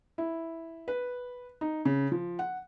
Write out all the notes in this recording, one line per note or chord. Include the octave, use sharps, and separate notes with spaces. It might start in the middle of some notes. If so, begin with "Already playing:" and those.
E4
B4
D#4
C#3
F3
F#5